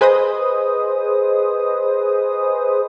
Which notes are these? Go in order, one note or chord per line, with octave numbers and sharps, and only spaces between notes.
G#4 B4 C5 D#5 D#6